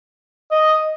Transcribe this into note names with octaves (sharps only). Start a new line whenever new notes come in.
D#5